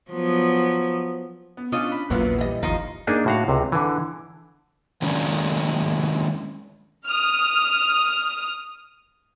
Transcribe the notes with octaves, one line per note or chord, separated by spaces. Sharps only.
F3 F#3 B3
B3
C#4 D4 F4 D#5
B5
A#1 E2 A#2 F#3 A#3 B3 E4 F4
E3 G3 D#5
G#1 D#2 F3 D#4 C6
A#3 D4 D#4 G#4
A2 F#4 F5
C#2 C3
D3 E3
D#3 F#3 G#3 A#3 C#4 D4
D#6 F6